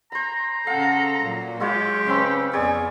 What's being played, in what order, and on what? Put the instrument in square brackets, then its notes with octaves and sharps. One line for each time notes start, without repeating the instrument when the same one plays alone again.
[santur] C5 B5 [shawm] A#5
[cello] C#3 A4 [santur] F5 F#5
[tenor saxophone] A#2 [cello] F#3
[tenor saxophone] G#3 [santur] E4 F4 C#5 [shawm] G4
[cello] C#3 B4 [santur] C4 C#4 B5
[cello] F2 B3 [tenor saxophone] G#4 [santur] C#5 D5 G#5